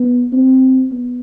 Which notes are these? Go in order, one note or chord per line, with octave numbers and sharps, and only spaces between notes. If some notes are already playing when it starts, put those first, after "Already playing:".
Already playing: B3
C4
B3